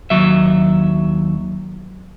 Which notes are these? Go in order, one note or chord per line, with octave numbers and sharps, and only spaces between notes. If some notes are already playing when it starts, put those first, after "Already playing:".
D#2 F#3 E5